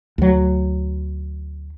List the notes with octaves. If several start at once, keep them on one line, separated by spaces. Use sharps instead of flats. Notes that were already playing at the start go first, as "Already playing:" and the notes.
D2 F#3